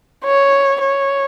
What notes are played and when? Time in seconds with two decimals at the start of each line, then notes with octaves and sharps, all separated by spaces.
0.24 C#5
0.81 C#5